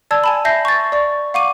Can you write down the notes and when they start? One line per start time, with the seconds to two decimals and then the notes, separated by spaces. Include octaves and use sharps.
0.11 D5 A5 E6 G#6
0.24 G#5 A5 B5
0.45 E5 A5 G6 A#6 C7
0.65 C#6 A6
0.92 D5 C#6
1.34 F5 F#5 C#6 D6 D#7